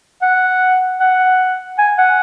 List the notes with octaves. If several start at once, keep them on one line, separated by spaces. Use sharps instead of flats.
F#5
F#5
G#5
F#5